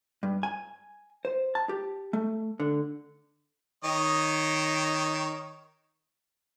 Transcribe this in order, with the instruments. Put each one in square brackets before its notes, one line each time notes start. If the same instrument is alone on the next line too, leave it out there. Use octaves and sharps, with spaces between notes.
[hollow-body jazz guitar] G2
G#5
C5
A5
G4
A3
D3
[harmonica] D#3 C#5 D#5